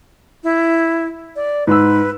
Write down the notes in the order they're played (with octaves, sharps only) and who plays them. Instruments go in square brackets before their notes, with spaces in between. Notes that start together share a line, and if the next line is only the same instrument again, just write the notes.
[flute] E4
D5
[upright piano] G#2 E6 [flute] B4